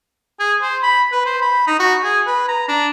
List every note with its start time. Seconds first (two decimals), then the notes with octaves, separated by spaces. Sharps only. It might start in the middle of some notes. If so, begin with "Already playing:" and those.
0.40 G#4
0.62 C5
0.83 B5
1.12 B4
1.26 C5
1.42 B5
1.67 D#4
1.80 F#4
2.04 G#4
2.27 B4
2.49 A#5
2.69 D4